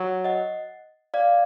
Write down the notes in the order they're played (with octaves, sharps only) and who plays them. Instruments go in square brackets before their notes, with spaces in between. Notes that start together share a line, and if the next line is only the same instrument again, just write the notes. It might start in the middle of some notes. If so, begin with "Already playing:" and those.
Already playing: [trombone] F#3
[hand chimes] D#5 F#5
D5 F5